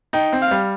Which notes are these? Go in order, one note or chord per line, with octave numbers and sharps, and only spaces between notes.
D#4 G5
C4
F5
G3